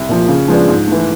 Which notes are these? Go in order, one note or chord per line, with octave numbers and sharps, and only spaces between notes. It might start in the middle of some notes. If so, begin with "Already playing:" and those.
Already playing: C2
A#2 F3
C#3
F3 G#3 B3 D4
G#2
E3 A3